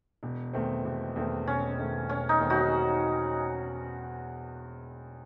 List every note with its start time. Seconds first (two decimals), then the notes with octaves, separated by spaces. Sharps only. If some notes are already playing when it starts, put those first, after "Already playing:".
0.23 E1
0.53 E2 D#3 A3 C4
0.85 E1
1.16 E2 D#3 A3 C4
1.47 E1 C#4
1.78 E2 D#3 A3 C4
2.09 E1 C#4
2.29 D#4
2.40 E2 D#3 A3 C4
2.50 D#4 F#4